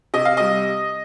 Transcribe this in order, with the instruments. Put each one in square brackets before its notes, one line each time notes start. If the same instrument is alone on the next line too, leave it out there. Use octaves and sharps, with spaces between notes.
[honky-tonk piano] C3 D#5
F5
G3 D#5